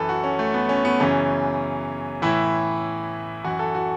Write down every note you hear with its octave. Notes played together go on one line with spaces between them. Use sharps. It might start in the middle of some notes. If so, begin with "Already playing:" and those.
Already playing: F#2 E3 A4 B4
F#4
C#4
A3
B3
C#4
B3
F#2 C#3 E3 C#4
A2 E3 E4
F#2 E3 F#4
A4
F#4